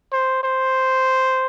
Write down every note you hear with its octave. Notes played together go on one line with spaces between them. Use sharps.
C5
C5